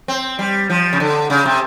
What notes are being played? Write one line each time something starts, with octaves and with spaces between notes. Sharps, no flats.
C4
G3
F3
C#3
D3
C#3
C3